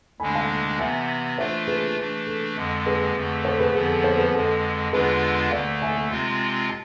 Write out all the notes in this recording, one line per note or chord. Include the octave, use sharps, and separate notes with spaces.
D2 D3 G#3 D4 G#5 B5
F5 A5
C3 E3 B3 E5 G#5
E3 A3 D4 F4 C5 E5
G#4 B4
E3 A3 D4
A4
F2 D3 G#3
G#4 B4
F2 D3 A3
A4 C5
G#4 B4
F2 D3 F3 B3 G#4
A4
A4 C5
G#4 B4
F2 D3 G#3 A4
E2 D3 G#3 D4 F4 G#4 B4
D2 D3 A3 D5 F5
E5 G#5
C3 G#3 C4 F4
A5